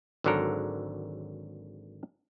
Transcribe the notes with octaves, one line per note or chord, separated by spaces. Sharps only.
G#1 G#2 D3 F#3 A4 A#4